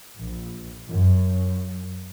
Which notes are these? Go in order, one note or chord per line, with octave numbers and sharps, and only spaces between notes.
A#1
F#2